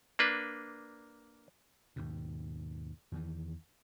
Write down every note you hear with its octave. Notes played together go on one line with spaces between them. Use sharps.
A#3 D4 B4
D#2 G#2 B2
E2 D#3 E3